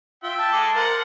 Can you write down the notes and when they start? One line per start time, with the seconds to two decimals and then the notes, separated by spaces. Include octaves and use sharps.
0.23 F4 E5 G5
0.39 A5
0.52 G#3 A4 D6
0.75 A#4 C5 F#5